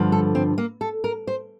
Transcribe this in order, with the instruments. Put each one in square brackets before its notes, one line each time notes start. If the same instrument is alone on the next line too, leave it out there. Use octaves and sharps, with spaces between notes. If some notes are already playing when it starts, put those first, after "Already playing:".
Already playing: [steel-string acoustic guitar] G2 D3 F3
A4
C4
A#3
A4
A#4
C5